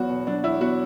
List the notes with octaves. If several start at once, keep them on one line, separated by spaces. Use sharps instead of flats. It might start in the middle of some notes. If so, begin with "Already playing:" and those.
Already playing: E2 F#3 B3 F#4
B2
F#3 D4
E2 E4
B3 F#4